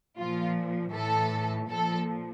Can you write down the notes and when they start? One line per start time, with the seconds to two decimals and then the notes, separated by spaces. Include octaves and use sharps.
0.17 A#2 F3 F4
0.93 A2 E3 A4
1.68 A#2 F3 A4